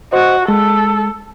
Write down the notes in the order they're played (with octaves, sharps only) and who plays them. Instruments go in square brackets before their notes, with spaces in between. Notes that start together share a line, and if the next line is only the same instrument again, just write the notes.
[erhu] F#4 [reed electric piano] C5 D#5
[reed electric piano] G#3 [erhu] A4